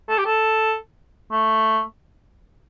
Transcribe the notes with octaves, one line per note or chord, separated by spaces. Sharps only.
A4
G4
A4
A3